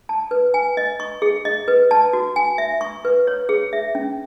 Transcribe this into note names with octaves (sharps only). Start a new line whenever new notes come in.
A5
B4
G#5
D#5
C#6
G#4
D#5
B4
A5
F#4
G#5
E5
C#6
B4
C#5
G#4
E5
C#4